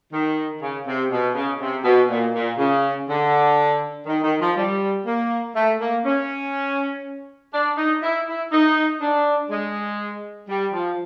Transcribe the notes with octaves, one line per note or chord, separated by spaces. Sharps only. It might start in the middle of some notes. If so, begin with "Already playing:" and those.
D#3
C#3
C3
B2
C#3
C3
B2
A#2
A#2
C#3
D3
D#3
D#3
F3
G3
A#3
A3
A#3
C#4
D4
D#4
E4
E4
D#4
D4
G#3
G3
F3